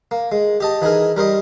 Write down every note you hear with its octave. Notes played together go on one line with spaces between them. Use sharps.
A#3
G#3
G4 D#5 A5
E3 D#4 G#4 A#4
G3 A#4 C5 D#5